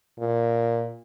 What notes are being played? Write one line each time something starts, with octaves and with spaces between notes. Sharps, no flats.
A#2